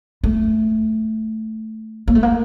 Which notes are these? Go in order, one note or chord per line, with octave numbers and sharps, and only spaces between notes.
A3
A#3
A3
A#3